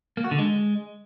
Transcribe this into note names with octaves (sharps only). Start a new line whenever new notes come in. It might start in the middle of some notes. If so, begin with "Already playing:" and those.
A#3
F#4
D3
G#3